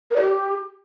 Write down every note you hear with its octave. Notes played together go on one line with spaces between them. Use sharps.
A#4
D5
G4